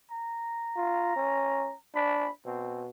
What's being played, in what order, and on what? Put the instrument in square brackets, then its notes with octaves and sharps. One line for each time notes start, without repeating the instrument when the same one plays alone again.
[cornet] A#5
[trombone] F4
C#4
[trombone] D4 [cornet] B5
[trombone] B2 [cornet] C4